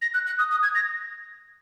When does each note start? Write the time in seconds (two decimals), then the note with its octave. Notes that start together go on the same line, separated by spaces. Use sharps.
0.02 A#6
0.14 F#6
0.26 F#6
0.39 D#6
0.51 D#6
0.63 G#6
0.75 A#6